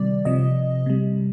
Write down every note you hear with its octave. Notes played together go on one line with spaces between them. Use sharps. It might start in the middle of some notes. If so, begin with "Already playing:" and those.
Already playing: C3 D#3 G3 D5
C3 F3 D#5
C3 G3